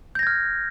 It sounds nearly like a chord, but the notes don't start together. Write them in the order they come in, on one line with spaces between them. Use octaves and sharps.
G6 A#6 G#6 F6